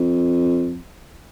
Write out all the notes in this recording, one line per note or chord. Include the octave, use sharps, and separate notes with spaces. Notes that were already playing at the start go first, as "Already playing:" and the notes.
Already playing: F2